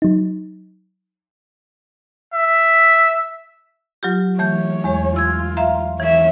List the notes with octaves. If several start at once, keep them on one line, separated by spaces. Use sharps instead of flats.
F#3 D#4
E5
F#3 F4 G4
E3 A3 C#5 G6
E2 G#3
F4 E6 G#6
E5 F5 A#5
E3 C#5 E5